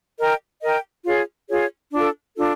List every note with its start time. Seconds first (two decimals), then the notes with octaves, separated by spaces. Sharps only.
0.19 A#4 D#5 G5
0.62 A#4 D#5 G5
1.05 F4 G#4 C#5
1.49 F4 G#4 C#5
1.92 D4 F4 A4
2.36 D4 F4 A4